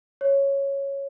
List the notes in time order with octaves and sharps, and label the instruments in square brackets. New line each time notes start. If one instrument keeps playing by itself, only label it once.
[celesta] C#5